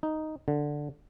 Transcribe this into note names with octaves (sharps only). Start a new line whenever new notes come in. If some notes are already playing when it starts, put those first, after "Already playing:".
D#4
D3